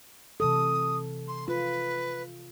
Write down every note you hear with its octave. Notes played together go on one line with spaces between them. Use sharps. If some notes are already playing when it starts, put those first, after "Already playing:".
C3 E3 A4 D#6
C6
F4 B4